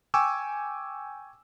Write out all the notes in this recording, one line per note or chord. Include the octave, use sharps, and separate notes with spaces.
G5 G#5 C#6 D6 E6